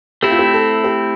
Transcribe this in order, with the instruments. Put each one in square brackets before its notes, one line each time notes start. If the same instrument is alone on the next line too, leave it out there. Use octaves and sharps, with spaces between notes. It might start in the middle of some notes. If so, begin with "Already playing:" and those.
[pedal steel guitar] A3 C4 E4 [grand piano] G4
[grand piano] F4
G4
A4
G4